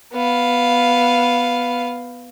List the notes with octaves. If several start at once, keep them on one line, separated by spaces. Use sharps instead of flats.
B3 F5